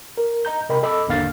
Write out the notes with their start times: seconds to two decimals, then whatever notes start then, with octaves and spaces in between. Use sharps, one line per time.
0.17 A#4
0.45 D#5 A#5 G6
0.69 C3 A#4 D#5 G5 B5
0.83 A4 D#5 B5 D6 E6
1.07 G#1 E2 D3 A#3 F5 A6